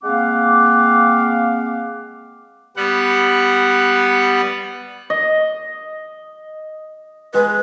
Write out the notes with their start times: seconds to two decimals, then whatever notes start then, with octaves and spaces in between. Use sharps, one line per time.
0.03 G#3 A#3 C4 F5 F#5 D6
2.77 G3 B3 F#5
5.10 D#5
7.34 G#3 B4